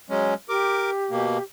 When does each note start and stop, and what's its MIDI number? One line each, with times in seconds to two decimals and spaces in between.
0.10 0.34 54
0.10 0.34 56
0.10 0.34 61
0.49 1.43 67
0.49 0.91 70
0.49 0.91 86
1.11 1.38 47
1.11 1.38 58